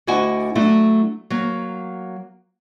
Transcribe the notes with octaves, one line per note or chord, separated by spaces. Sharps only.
D2 D3 E4 F#4 D#5 G#5
F#3 A3 D4 E4
F#3 A#3